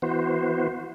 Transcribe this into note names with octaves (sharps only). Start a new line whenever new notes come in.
E3 B3 F#4 C5